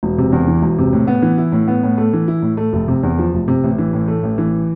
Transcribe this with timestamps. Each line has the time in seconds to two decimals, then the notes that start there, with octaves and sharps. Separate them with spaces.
0.03 E1
0.18 C3
0.32 E2
0.47 E3
0.62 E1
0.78 C3
0.93 A2
1.07 B3
1.22 E3
1.38 E4
1.52 A2
1.68 B3
1.83 A2
1.98 A3
2.13 E3
2.28 E4
2.42 A2
2.57 A3
2.73 F1
2.88 C3
3.03 E2
3.19 F3
3.34 F1
3.48 C3
3.64 A1
3.78 E3
3.93 A2
4.08 A3
4.23 A1
4.38 E3